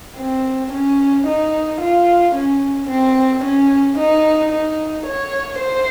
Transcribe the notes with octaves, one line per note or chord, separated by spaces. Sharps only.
C4
C#4
D#4
F4
C#4
C4
C#4
D#4
D#4
C#5
C5